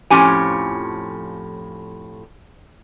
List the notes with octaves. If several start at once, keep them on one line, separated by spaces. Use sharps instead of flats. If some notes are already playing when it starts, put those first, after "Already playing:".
F2 A2 F3 C#4 G4 G#5